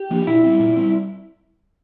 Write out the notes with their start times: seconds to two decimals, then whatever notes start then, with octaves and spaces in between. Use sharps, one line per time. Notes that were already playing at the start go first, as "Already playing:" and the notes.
Already playing: G4
0.10 F3 A#3 D4
0.27 A#2 E4
0.44 G3 C4
0.60 A#2
0.77 G3 C4